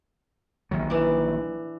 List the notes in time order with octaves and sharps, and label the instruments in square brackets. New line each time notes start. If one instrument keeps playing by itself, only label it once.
[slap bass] A#1 D#3 F#3
[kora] E3 D4